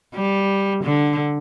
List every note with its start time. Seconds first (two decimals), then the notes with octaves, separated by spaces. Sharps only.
0.15 G3
0.84 D3